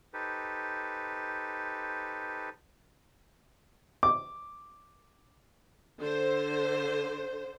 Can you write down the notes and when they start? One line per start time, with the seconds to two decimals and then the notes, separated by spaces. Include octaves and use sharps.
0.14 D#4 G4 A4 B4 C5
4.03 D6
5.99 D3 C5